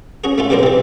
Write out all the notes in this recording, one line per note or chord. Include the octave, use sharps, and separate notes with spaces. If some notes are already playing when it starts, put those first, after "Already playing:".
C#4 F#4 G#4
A3 C#4 F4
D2 B2 F#3 D4 A#4 C5
C3 E3